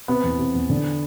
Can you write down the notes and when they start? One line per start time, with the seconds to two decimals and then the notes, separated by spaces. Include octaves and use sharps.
0.08 C3 B3
0.24 E2
0.39 C3
0.54 E2
0.70 D3